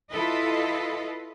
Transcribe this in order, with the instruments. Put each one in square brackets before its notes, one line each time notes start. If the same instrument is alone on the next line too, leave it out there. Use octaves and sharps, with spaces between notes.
[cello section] E4 F4 A4 B4 D#5